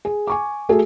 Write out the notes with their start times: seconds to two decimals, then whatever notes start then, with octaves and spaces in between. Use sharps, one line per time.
0.05 G#4
0.27 G#5 C#6 D6
0.69 A3 F#4 G#4 A4